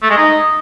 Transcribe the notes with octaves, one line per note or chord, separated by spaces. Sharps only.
A3
G#3
D#4